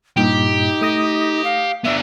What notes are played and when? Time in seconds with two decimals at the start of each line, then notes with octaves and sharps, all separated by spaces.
0.17 G2 A#2 D#4 G4
0.81 A3 D#6 A#6
1.44 F5
1.85 B3 D4 E5